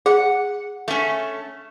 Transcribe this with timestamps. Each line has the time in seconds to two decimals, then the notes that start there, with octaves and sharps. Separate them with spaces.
0.06 G#4 F#5
0.88 A3 C#4